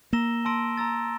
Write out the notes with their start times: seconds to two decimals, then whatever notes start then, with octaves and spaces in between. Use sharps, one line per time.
0.13 A#3 A#5 E6 A#6 E7 G7
0.45 A5 C6 E6 A#6 D7
0.77 A#5 E6 A6